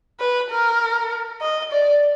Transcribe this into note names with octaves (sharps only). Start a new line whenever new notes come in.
B4
A#4
D#5
D5